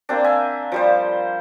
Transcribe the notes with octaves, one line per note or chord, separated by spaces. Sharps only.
A#3 C4 D4
E5 G#5
F3 G3 C5